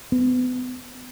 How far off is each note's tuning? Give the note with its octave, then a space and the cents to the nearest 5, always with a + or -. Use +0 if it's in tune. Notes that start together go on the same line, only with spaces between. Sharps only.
B3 +35